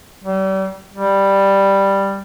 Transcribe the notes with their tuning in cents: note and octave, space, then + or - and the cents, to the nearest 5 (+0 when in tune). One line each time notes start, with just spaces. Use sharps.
G3 -40
G3 +5